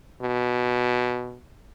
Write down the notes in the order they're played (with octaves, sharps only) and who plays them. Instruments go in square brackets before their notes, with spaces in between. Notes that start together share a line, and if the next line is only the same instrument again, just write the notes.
[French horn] B2